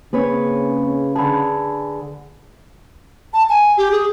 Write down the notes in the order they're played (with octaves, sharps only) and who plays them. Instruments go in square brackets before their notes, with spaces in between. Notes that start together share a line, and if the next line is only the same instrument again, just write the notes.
[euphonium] C#3 [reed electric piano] A#3 C4 C#4 [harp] G#4 B4 C#5
[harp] D3 G#4 [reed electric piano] A5 B5
[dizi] A5
G#5
G4
G#4